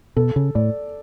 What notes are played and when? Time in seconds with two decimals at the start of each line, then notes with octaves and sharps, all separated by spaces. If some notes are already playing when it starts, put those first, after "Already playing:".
0.17 B2 A4
0.36 C#3
0.55 A2 D5